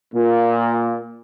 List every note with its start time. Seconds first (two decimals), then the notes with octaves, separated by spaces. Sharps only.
0.15 A#2